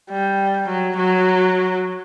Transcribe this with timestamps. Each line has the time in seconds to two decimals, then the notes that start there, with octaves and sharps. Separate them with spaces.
0.10 G3
0.68 F#3
0.97 F#3